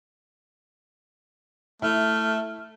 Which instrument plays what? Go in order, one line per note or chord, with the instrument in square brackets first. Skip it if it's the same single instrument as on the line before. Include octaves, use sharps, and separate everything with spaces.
[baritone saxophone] A3 [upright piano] E4 [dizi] F6